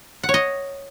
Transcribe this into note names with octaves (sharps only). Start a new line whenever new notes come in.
F#5
C#5
D#5